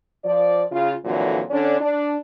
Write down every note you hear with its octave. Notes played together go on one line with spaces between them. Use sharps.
F3 D5
C#3 F4
F2 A#2 D3 E3 F#3
D3 C#4 D4
D4